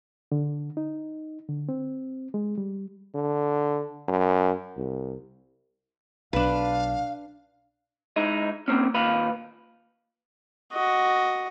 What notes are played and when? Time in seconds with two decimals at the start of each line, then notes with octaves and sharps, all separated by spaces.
0.32 D3
0.77 D#4
1.49 D3
1.69 C4
2.34 G#3
2.58 G3
3.15 D3
4.08 F#2
4.77 C2
6.33 B1 D4 B4 F5
8.16 G#3 D#4 E4
8.68 A#3 C4 C#4
8.94 D#2 A#2 B4 F5 B5
10.73 F#4 D#5